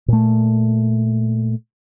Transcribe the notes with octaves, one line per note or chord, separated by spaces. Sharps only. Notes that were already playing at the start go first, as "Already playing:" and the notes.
A#2 A3